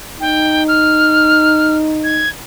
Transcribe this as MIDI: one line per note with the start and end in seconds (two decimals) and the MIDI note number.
0.21 2.24 63
0.21 0.64 79
0.68 1.75 89
2.04 2.29 92